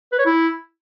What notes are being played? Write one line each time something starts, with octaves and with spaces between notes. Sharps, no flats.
B4
C#5
E4